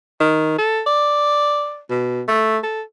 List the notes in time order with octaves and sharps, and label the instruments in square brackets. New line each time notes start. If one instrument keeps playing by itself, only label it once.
[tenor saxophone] D#3
A4
D5
B2
A3
A4